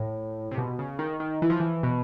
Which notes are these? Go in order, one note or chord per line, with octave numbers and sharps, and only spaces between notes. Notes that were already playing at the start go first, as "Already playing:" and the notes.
Already playing: A2
C3
B2
C#3
D#3
D#3
E3
F3
E3
B2